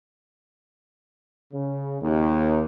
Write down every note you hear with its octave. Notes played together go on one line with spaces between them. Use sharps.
C#3
D#2